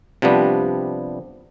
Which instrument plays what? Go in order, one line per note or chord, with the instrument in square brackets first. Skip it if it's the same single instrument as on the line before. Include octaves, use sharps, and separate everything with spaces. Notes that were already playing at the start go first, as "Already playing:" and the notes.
[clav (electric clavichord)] C3 F3 G3 B3 D4